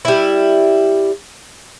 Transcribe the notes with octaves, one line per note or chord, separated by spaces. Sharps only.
G3 E4